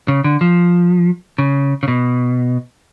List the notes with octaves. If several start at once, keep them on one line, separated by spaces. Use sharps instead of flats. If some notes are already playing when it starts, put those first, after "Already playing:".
C#3
D3
F3
C#3
C#3
B2